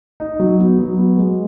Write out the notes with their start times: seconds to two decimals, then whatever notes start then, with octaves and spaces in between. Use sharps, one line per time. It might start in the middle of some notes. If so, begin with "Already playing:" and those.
0.20 D#4
0.40 F#3
0.59 B3
0.79 F#3
0.98 B3
1.18 G#3